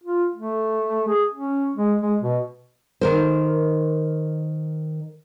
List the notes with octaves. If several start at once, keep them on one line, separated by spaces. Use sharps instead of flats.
F4
A3
G#4
C#4
G#3
G#3
B2
D#3 A#4 C5